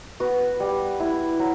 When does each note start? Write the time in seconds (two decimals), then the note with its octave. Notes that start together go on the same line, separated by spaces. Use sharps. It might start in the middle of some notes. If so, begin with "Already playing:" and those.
0.20 B3 F#4
0.60 G3
1.00 E4
1.39 F#3